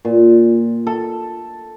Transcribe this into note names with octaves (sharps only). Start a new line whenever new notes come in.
A#2
A4